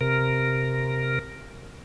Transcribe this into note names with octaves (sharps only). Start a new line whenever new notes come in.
C3 A#4